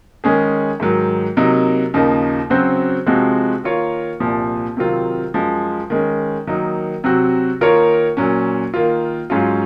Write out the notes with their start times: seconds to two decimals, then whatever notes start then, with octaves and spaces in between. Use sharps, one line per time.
0.24 D#3 G#3 C#4 G#4
0.80 G#2 D#3 F#3
1.37 C3 F#3 A#3 D#4 A#4
1.94 D#2 C#3 F3 A#3 D#4
2.50 C#3 F#3 C4 F#4 C5
3.07 C3 F3 G#3 C4 F#4
3.64 D#3 A#3 F4 A#4 C#5
4.20 C2 A#2 F3
4.77 C3 D#3 F#3 C4 F4
5.34 F#2 F3 G#3
5.90 D#3 G#3 C#4
6.47 D#3 F#3 A#3 D#4
7.04 C3 F#3 C4 F#4
7.61 D#3 A#3 F4 A#4 C#5
8.17 A#2 F#3 C#4
8.74 D#3 A#3 F4
9.30 G#2 F#3 C#4 F4